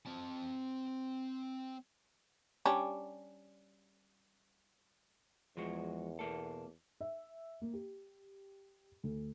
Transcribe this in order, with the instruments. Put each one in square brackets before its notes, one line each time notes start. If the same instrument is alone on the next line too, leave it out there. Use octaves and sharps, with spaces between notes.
[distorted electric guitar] C4 A5
[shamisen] G3 C#4 D4
[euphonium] E2 [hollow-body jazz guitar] F3 G#3 F#4
[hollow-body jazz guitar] B2 A#3 A4
[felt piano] E5
A#3
G4
D2